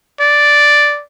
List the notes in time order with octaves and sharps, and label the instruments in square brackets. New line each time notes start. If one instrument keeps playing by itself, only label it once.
[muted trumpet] D5